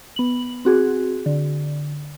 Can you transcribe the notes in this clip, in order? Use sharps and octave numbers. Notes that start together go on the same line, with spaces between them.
B3 F#7
C4 F#4 G#4
D3